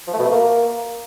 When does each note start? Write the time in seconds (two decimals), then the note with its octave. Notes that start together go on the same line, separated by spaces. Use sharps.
0.07 F3
0.13 A3
0.19 B2
0.25 A3
0.31 A#3